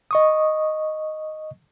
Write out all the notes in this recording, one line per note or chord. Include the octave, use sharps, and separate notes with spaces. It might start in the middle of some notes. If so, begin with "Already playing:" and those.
D#5 C#6 D#6